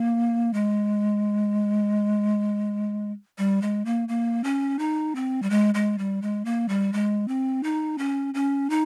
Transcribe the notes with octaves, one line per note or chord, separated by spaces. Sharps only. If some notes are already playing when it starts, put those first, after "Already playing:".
Already playing: A#3
G#3
G3
G#3
A#3
A#3
C#4
D#4
C4
G3
G#3
G#3
G3
G#3
A#3
G3
G#3
C4
D#4
C#4
C#4
D#4